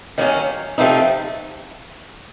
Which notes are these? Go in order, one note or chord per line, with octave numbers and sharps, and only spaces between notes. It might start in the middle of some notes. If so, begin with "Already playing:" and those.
D#3 F#3 A#3 C#4
C3 F3 A3 C4 D#4